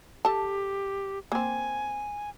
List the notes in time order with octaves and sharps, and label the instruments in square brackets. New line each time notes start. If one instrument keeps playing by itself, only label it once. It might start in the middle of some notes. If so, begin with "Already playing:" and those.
[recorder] G4 [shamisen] A4 A5
[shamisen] A#3 C4 [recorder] G#5